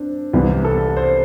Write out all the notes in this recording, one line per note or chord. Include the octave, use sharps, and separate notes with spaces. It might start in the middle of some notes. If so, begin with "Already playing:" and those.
Already playing: C4 D4
C2 C3 E3
A4
C5